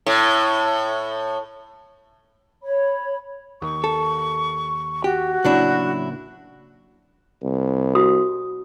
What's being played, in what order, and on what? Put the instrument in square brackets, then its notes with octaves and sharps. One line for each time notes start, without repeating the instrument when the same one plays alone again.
[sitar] A2
[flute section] C#5 B5
[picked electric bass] D#2 [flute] C#6
[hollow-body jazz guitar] A4
[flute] F#4 [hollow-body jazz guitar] G4
[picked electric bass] A1 C#3 A#3 [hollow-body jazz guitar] F#3 D4 E4
[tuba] C2
[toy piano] F#4 D#6